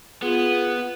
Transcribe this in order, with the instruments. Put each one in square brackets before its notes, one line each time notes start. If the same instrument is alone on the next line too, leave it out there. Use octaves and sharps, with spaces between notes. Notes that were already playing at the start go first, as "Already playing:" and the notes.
[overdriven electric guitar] B3 [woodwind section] F4 G#4